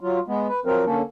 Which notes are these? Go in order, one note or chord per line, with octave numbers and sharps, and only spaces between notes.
F#3 F4
G#3 B3
B4
F3 F#3 C4 A#4
D3 A#3 C#4 A4